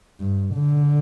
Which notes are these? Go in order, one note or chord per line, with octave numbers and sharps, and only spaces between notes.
G2
D3